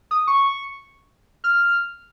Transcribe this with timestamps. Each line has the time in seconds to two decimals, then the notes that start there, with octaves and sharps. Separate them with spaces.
0.11 D#6
0.27 C#6
1.44 F6